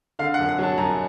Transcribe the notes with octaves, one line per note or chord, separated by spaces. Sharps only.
D3 F5
F#5
F#2
F#5
F#3 A5
F#2 A#5